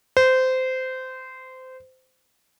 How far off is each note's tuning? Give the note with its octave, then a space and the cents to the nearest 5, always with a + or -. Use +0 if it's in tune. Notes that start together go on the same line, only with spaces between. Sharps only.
C5 -20